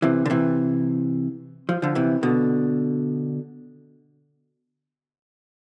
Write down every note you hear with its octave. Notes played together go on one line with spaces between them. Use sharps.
C3 E3
D3
C3 E3
F3
D3 F3
C3 E3
B2 D3